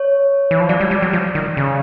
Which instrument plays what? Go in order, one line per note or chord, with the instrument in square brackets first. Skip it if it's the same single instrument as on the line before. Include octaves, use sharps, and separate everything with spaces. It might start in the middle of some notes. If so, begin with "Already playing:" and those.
Already playing: [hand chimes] C#5
[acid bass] E3
F3
[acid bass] F#3 [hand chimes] D5
[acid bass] G3
G3
F#3
F3
D#3
C#3